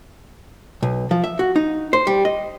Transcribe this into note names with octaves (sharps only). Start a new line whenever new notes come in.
B1
F3
E5
F#4
D#4
C5
G3
D#5